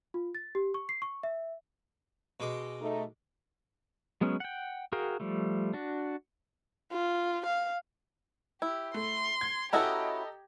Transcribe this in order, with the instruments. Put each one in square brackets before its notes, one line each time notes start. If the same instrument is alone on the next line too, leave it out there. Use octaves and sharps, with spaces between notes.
[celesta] F4
A6
G4
C#6
C7
C#6
E5
[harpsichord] B2 G#3 D6
[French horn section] A3 D#4
[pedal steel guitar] F#3 G#3 B3 C#4
F#5 G5
F#4 G#4 A#4 F5 G5
F3 G3 A3
D4 F#4
[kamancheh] F4
F5
[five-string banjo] E4 [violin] G4
[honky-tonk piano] A3 [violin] C6
[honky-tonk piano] G#6
[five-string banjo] C#4 E4 F#4 [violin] G4 [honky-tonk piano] A4 D#5 A#5